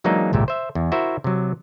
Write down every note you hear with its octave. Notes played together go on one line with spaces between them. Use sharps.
E3 F#3 G#3 A#3 D4 D#4
G#1 C#2 A#2 G4 E5
C5 E5
E2
E4 F#4 A#4 C5 E5
C3 F#3